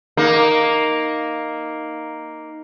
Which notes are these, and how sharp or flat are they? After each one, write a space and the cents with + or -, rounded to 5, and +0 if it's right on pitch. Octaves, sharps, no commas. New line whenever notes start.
A#3 +0 D#4 +0